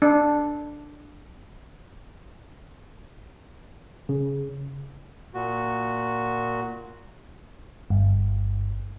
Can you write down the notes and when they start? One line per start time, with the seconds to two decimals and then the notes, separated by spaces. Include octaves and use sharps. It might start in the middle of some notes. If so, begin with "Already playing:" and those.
0.02 D4
4.09 C#3
5.34 A#2 F#4
7.90 G1